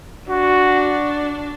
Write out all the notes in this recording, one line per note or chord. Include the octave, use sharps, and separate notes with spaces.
D4 F#4